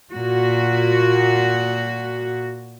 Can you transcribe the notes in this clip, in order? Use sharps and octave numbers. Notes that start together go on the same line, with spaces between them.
A#2 F#4